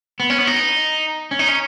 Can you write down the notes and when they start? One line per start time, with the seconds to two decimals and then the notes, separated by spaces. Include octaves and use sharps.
0.20 B3
0.30 C#4
0.38 B3
0.47 D#4
1.31 C#4
1.39 D#4
1.49 C#4